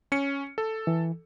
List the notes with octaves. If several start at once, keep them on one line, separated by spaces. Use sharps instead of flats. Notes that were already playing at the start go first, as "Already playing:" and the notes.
C#4 C#7
A4
E3